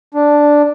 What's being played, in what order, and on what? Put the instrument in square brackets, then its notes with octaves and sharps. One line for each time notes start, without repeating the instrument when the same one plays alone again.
[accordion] D4